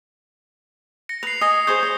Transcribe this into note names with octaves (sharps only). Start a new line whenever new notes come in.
A#6 C#7
B4 C7 F7
D#5 G#5 D#6 A#6
G#4 C5 C#5 G6 G7
C#5